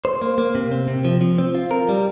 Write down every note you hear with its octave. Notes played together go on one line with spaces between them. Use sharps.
C5
A#3
A#3
C3
C4
C3
F3
F3
C4
F4
A#4
G3